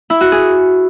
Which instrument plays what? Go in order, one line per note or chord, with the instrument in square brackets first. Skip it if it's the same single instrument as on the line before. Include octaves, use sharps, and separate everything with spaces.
[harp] E4
F#4
G#4